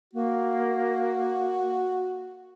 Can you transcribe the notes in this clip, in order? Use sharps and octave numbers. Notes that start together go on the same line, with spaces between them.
A#3 F#4